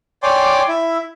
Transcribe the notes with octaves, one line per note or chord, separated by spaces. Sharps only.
C#5 D5 G5 G#5 C6 D6
E4 E5